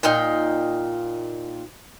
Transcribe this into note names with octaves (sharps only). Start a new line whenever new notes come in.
A#2 D#4 F5 G5